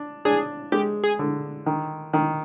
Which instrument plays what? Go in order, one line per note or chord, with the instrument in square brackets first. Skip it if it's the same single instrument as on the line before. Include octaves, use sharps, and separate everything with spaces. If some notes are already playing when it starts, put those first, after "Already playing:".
Already playing: [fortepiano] D4
[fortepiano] D4 [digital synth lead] G#4
[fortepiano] G#3 [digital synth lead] G4
[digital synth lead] G#4
[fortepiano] D3
D#3
D#3